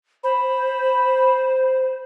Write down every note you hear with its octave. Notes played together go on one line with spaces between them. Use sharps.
C5 B5